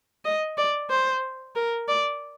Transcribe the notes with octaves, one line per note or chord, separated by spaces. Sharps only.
D#5
D5
C5
A#4
D5